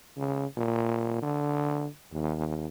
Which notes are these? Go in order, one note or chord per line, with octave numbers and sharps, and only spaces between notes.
C#3
A#2
D3
D#2